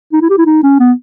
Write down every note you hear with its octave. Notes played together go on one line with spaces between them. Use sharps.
D#4
E4
G4
E4
D#4
C#4
B3